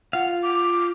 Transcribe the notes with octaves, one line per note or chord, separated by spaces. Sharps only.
F4 F5 F#5
D6